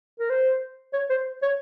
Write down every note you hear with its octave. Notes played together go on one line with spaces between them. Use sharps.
A#4
C5
C#5
C5
C#5